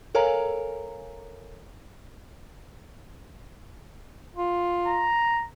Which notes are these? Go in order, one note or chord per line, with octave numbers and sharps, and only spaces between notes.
A4 A#4 C#5 F5 G#5 A#5
F4
A#5